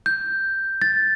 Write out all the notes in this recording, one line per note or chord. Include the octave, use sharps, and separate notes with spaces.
G6
A6